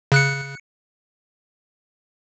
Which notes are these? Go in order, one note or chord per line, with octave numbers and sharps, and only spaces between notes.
C#3 F#6 C#7